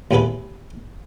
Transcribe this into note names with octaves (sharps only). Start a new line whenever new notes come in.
D#2 A2 B3 G#4 A4 B4